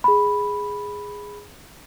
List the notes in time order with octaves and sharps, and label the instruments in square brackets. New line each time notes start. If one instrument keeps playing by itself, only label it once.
[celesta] G#4 B5